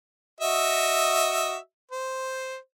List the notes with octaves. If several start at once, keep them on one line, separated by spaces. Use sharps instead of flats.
F#4 D#5 E5
C5